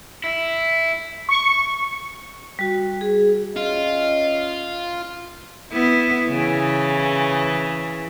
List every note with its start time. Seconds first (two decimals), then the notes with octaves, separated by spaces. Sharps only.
0.24 E4
1.29 C#6
2.59 G3 F#4
3.01 G#4
3.56 C#4 F4 D#5
5.72 B3 E4
6.29 C#3 E3